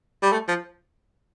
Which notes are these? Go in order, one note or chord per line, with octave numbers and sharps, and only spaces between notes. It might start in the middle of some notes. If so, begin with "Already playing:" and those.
G3
A3
F3